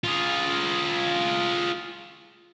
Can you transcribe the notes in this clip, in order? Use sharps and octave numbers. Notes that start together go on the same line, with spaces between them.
F4 G#4